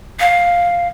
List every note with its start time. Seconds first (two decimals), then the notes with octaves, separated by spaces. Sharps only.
0.20 F5